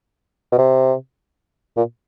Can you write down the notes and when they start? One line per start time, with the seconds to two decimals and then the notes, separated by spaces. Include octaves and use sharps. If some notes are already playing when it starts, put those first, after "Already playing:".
0.52 B2
0.59 C3
1.77 A#2